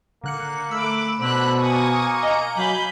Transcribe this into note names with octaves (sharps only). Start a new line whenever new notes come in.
D3 A#3 F#6 C#7
A3 B5 D6 E6
B2 D3 C5 B5 F#6
A#3 G#5 C#6 D#6
D#5 A#5
F#3 F5 G#5 B5 G6 F#7